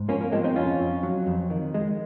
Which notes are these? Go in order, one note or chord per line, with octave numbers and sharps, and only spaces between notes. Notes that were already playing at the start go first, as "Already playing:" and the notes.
Already playing: G#2
F3 A#3 C#4
A#3
F3 G#3 C4
C4 D#4
F2 C#4 F4
F2
F#3
F2
D#3
G#3